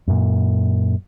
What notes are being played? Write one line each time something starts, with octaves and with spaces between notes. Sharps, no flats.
F#2 A#2